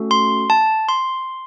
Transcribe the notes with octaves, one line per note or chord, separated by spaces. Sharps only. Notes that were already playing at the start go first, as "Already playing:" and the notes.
Already playing: A3 C#4 F#4 A4
C6
A5
C6